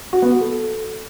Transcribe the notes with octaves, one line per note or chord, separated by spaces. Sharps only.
F#4
B3
F#4
A4